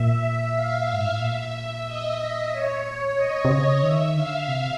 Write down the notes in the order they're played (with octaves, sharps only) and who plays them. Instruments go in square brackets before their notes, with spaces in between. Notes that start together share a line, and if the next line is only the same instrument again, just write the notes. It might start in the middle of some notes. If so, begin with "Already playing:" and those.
Already playing: [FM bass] A#2 [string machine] E5
[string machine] F5
[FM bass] G#2
A2
[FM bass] A#2 [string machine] E5
[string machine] D#5
C#5
[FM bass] B2 [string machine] D#5
[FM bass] C3
C#3
[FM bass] D#3 [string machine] E5
[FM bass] D3 [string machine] F5
[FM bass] C3